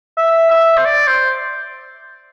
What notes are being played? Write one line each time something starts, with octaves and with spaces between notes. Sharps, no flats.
E5
E5
C5
D5
C5